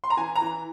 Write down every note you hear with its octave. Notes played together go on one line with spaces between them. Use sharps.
C6
A#5
E3 G#5
A#5
E3